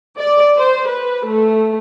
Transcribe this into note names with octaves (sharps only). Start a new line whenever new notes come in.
D5
C5
B4
A3